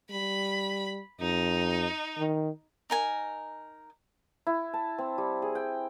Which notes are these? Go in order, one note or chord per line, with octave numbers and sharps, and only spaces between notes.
G3 B5
F2 D#4
D#3
D#4 A#4 G#5
E4
A5
C4
G3
G#4
G5